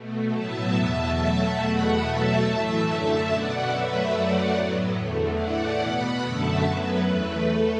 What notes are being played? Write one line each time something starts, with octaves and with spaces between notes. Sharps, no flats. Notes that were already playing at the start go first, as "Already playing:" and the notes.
Already playing: B2 A3
A2 F#3 B3 E5 A5
E2 B2 B3
B2 F#3 A3 E5 A5
E2 B2 A3 F#5 B5
B2 F#3 A3 E5 A5
A2 E3 A3
F#2 D3 A3
B2 B3 D5 F#5
F#2 F#3 A3 B4 E5
F#2 F#3 A3 D5 F#5
A2 F#3 B3
E2 D3 A3
A2 E3 A3 D5 F#5
B2 B3 F#5 B5
F#2 D3 A3 E5 A5
F#2 F#3 B3 B4
E2 E3 A3
A3 A4